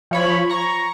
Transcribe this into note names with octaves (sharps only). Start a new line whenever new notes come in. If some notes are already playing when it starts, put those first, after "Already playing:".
F3 C#5 B5
A#5 C#6